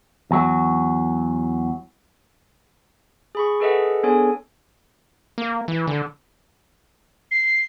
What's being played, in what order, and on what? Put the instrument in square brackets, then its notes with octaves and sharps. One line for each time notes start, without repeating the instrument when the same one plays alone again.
[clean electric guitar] E2 F#3
[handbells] G#4 B5 C#6
G#4 A4 B4 D#5 E5 F#5
B3 D4 G#4 A4 C#5 G#5
[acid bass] A#3
E3
D3
[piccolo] C7